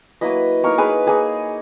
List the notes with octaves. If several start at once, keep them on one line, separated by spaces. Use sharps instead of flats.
F#3 A#3 E4 B4 D#5
A#3 D#4 A#4 C#5
G#4 B4
A#3 D#4 G#4